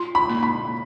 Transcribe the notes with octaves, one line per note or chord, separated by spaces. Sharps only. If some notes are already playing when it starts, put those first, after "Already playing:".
Already playing: F4 C6
B5
A#3
B5